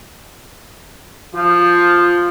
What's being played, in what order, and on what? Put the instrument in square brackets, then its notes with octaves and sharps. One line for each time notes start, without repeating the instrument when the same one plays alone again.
[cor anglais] F3 [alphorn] F4